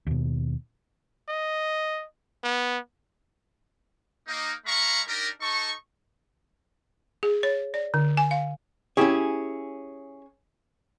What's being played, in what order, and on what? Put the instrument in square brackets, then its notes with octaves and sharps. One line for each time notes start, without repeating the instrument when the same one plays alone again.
[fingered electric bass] D#2 B2
[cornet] D#5
B3
[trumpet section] A#3 D#4
G#3 F5 A#5 B5 C#6
D4 D#4 G4 A#4
D#4 A4 C#6
[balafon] G#4
C#5
D5
D3
G#5
F5
[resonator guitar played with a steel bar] C#4 G#4 [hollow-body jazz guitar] E4 G4 C#5